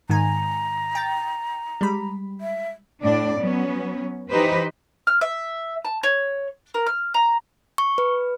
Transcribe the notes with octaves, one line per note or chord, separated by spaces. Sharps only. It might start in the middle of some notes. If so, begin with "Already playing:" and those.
G#2 D#3 G#5 A#5
G5 A6
G3 G#3 B5
E5
A2 D4 D5
F#3 B3 C#4
E3 D#4 G4 B4 C5
F6
E5
A5
C#5
A#4
F6
A#5
C#6
B4